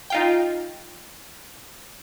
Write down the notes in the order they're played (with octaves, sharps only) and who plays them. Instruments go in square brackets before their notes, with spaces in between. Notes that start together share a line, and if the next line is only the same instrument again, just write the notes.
[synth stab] D#4 F4 G5